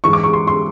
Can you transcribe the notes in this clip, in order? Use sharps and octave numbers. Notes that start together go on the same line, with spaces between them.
G#2 E3 G#3 C#6
D6
C#6
C6
C6